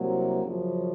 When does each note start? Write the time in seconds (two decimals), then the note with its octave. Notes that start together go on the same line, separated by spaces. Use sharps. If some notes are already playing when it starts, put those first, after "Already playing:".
Already playing: C2 C3 F#3 A#3
0.43 F#2 C#3 F3